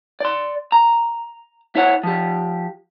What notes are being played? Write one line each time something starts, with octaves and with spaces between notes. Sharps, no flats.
D5 C6
A#5
E4 C#5 F#5
F3 G4